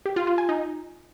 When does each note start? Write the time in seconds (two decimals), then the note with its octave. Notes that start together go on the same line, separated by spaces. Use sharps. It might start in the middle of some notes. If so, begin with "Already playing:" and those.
0.06 G4
0.16 F4
0.27 F4
0.38 G#5
0.49 D#4